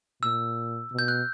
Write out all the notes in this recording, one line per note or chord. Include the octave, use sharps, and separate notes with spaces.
A#2 E6
B2
G6
F#6